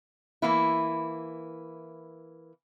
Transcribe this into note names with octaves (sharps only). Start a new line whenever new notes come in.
E3 A#3 E4